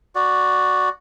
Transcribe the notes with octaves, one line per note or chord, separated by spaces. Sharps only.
F#4 D5